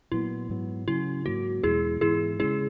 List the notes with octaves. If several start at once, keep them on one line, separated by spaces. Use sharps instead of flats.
A#2 F#3 B3 E4
G#2 F#3 B3
C#3 F#3 C#4 E4
G#2 F#3 A#3 F#4
E2 B2 G#3 E4 G#4
G#2 E3 B3 E4 G#4
C#3 G#3 C#4 E4 G#4